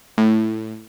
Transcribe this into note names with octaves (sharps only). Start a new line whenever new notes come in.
A2